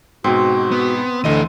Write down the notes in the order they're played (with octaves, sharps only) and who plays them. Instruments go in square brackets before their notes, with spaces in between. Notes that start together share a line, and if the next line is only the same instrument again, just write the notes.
[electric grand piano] G#2 B2 [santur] C4 [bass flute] F#4
[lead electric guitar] B3
[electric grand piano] D2 D#5 D#7 [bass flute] D3 [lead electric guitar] E3 A3